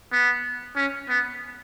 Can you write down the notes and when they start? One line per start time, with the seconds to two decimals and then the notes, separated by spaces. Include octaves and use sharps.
0.12 B3
0.76 C#4
1.09 B3